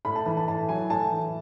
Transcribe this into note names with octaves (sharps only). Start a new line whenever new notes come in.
A2 B5
A5
E3 B5
A5
A2 A5
F#3 G#5
A2 A5
E3